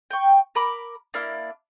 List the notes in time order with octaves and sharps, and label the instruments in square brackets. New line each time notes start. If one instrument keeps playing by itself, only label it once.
[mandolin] G5 C#6
A#4 B5 D6
A#3 D4 E4 F6